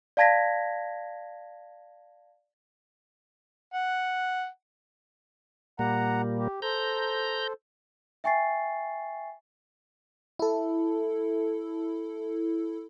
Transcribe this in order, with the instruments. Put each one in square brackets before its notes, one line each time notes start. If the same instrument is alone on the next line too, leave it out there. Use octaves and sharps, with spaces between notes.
[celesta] D5 F5 A5 G#6 A#6 B6
[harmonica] F#5
[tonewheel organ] A#2 G3 A#3 [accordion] F#5 A#5
[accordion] G4
[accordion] A4 C5 [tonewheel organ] A#5 G6
[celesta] E5 G5 G#5 C#6 A6 C7
[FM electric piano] E4 A4